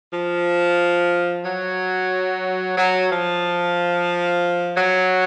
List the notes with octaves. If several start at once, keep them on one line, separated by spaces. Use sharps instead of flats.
F3
F#3
F#3
F3
F#3